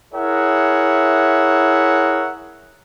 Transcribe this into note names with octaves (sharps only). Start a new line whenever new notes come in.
E4 G#4 A#4 C#5 E5 F#5